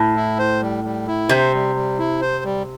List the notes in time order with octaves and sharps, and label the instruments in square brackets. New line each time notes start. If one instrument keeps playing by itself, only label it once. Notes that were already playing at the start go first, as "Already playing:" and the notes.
Already playing: [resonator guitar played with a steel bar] A2
[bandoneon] E4
C5
G3
G3
E4
[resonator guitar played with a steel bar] C3 [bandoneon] C5
[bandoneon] G3
G3
E4
C5
G3